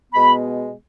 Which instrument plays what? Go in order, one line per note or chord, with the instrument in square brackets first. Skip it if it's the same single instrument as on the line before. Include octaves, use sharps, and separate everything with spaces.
[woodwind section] B2 G#3 B3 B5